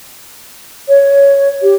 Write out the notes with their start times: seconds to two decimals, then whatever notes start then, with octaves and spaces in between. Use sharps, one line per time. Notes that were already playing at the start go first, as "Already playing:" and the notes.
0.89 C#5
1.63 G4